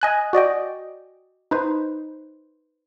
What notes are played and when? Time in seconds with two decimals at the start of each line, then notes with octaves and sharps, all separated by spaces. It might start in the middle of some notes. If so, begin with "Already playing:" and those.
0.01 D#5 G#5 F#6
0.33 F#4 D5 D#5 G5
1.51 D#4 B4 C5